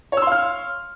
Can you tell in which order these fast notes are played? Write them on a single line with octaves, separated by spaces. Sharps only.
C#5 E6 C6 F5 F6